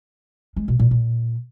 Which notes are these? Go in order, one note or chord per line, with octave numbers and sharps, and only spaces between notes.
G#3
B2
A#2
A#2